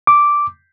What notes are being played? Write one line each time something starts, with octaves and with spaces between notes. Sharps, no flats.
D6